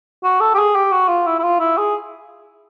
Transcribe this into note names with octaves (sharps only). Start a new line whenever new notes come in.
F#4
A4
G4
G#4
G4
F#4
F4
E4
E4
F4
E4
G#4